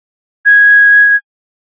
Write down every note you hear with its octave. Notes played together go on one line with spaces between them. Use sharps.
G#6